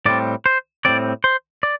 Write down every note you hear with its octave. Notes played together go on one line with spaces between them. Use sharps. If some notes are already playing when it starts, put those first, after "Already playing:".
A2 G3 C4 D5
C5
A2 G3 C4 D5
C5
D5